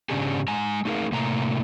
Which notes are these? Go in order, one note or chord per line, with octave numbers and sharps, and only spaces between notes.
G#2 C#3 C#4 D4 G4 G#4
G#3 G#5 A#5
A3 D#4 G#4 A#4 F5
A2 C3 A3 A#3 A#5